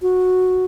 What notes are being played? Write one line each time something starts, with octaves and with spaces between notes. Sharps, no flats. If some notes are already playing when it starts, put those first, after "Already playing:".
F#4